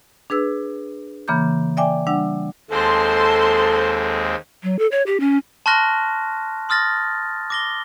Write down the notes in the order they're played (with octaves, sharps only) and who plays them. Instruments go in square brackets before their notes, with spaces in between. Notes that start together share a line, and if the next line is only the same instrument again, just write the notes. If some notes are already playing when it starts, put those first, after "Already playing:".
[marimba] D4 G#4 B4 E6
C#3 E3 A#3 B5 D6 G6
D5 E5 G5 G#5 D6
G3 D4 F#5 E6
[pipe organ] D#2 G#3 C4 [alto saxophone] A4 [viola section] C5 A5 C6
[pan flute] F#3
A4
C#5
G4
C#4
[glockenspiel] A5 C6 C#6 F6 F#6 A#6
C6 D#6 F6 A6 A#6
D6 A#6 G7